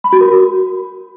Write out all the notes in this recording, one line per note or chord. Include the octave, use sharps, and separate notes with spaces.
B5
F#4
A#4
F#4